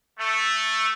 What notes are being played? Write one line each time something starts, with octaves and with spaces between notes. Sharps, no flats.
A3